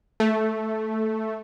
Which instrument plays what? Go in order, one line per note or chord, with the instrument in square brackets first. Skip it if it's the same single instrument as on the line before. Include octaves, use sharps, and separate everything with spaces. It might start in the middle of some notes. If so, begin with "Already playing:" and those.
[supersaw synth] A3